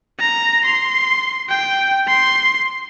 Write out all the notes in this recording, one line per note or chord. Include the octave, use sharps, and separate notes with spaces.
A#5
C6
G5
C6